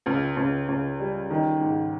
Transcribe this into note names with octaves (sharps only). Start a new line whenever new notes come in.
C#2
C#2
C#2
G3
D#3
G#2